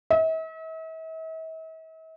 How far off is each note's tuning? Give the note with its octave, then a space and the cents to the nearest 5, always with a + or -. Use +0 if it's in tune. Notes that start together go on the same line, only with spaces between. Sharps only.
E5 -45